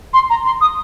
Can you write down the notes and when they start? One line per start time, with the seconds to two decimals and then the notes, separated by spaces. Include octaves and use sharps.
0.14 C6
0.30 A#5
0.45 C6
0.61 D#6